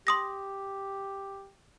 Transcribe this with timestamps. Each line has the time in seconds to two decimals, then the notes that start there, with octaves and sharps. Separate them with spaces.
0.07 G4 C6 D#6 A#6